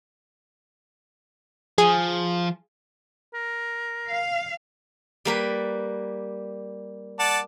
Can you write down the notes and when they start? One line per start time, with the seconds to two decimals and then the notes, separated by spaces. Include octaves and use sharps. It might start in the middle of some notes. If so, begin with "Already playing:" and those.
1.78 F3 G#4
3.34 A#4
4.09 F5
5.25 G3 A#3 B4
7.19 D5 F#5 A5